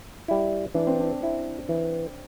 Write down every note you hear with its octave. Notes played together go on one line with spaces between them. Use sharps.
G3 E4
E3 D4
C4
D4
C4 E4
E3